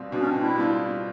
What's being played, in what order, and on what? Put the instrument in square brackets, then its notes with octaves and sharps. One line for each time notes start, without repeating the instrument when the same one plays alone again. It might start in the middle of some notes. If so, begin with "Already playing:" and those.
Already playing: [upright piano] B2 G3 C4 F4
[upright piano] B2 [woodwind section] D4
[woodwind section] C#4
C4 D4
D4 E4
[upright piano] G3 C4 F4